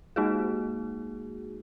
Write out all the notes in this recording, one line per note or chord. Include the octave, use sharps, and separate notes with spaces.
G#3 A#3 D#4 F#4 G#4